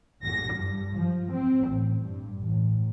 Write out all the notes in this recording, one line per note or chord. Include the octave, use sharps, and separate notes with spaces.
A#6
G2
F3
C4
A1
G2
A1